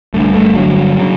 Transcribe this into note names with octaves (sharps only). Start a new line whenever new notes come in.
G1 G2 D3 A3
A3
G1 G2 D3 F#3
C#3